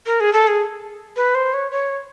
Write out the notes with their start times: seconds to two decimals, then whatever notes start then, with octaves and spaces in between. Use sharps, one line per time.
0.06 A#4
0.20 G#4
0.33 A4
0.47 G#4
1.16 B4
1.35 C5
1.54 C#5
1.71 C#5